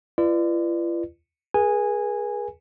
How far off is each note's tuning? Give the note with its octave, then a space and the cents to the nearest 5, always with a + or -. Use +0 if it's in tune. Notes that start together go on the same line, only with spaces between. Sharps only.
F4 -45 B4 +0 D5 +25
G#4 +0 B4 -45 G#5 -10